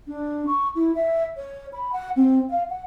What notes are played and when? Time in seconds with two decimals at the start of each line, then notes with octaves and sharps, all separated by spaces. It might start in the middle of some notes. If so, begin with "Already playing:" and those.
0.07 D4
0.47 C#6
0.75 E4
0.95 E5
1.36 C#5
1.73 B5
1.92 F#5
2.16 C4
2.50 F5
2.70 F#5